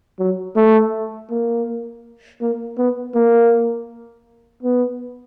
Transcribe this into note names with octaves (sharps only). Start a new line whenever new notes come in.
F#3
A3
A#3
A#3
B3
A#3
B3